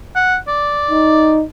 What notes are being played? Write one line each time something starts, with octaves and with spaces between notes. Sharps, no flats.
F#5
D5
D#4